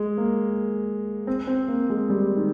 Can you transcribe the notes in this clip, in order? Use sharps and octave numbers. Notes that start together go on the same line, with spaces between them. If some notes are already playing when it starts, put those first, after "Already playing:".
Already playing: G#3
A#3
C4
C4
A#3
G#3
G3
D#3